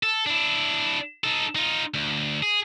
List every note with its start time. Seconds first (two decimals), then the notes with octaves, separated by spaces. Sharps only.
0.03 A4
0.26 D4 E4
1.24 D#4 A4
1.56 D#4 F4
1.94 D2
2.43 G#4